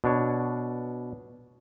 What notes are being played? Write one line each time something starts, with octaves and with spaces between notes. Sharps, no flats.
B2 D4 C#5